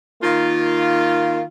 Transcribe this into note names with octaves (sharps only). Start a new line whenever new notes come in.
D#3 A#3 F4